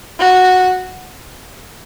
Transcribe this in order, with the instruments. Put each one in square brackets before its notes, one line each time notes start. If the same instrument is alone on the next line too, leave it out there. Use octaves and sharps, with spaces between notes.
[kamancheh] F#4